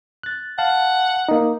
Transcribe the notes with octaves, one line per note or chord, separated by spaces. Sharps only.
F#6 A6
F5 F#5 A5
A#3 D#4